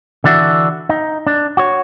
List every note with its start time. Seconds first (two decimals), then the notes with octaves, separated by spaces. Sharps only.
0.24 D3 E3 D4 F#4 E5
0.89 D#4
1.27 D4
1.57 F#4 C#5